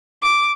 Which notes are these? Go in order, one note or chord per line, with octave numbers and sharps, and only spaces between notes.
D6